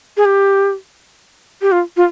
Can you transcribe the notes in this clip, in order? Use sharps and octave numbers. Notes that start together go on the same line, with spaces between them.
G#4
G4
G4
F4
F4